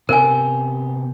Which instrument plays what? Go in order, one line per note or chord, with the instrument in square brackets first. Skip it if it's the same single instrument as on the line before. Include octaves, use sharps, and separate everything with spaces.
[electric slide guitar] C3 B3 G4 [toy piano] A#4 G#5